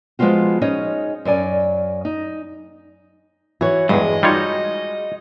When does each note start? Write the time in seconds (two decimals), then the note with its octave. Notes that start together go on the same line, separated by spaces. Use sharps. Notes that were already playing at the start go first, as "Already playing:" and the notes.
0.19 F3 G#3 B3 C#4 F4 F#4
0.61 C#4 D#4 G#4 C#5 D#5
1.25 F#2 A#4 D5 G#5
2.05 D#4
3.61 E3 F#4 C#5
3.89 E2 G2 G#3 D#5
4.23 G3 D#4 F4 F#4 C#5